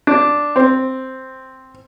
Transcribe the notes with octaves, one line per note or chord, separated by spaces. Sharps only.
D4
C4